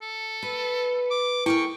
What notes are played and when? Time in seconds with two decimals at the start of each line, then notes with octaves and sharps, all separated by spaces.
0.02 A4
0.43 B4
1.11 D6
1.46 E4 G#4 A#4 G5 C#6